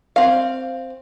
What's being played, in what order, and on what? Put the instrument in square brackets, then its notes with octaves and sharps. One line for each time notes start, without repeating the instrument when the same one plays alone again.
[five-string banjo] C4 F5